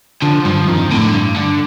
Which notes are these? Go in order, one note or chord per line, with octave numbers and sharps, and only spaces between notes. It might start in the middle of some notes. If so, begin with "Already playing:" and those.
D3 F3
G2 F3
F2 D#3
C3
A2 D3
G2
D3